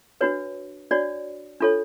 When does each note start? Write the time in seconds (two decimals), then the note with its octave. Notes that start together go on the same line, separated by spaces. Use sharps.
0.21 D4 F#4 B4 C#5
0.91 D4 F#4 C#5 D5
1.60 D4 F4 A4 C#5